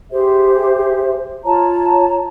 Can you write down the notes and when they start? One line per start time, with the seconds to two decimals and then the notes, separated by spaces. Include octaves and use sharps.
0.12 G4 G#4 C5 E5
1.44 F4 C#5 A5 A#5